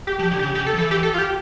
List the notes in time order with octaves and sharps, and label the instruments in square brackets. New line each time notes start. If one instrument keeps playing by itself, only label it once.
[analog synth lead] G4
[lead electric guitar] F3
[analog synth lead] G4
[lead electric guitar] D3
[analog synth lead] G4
[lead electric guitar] C#3
[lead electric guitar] C#3 [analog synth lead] G4
[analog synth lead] A4
[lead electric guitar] F3
[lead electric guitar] E3 [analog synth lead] A4
[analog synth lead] G4
A4
F4
G4